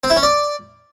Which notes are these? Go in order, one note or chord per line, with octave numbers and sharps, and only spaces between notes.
C4
E4
C#4
D5